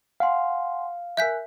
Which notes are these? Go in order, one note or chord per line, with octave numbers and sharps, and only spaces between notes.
F5 F#5 G#5 C6
A#4 E5 G#5 F#6 G6 B6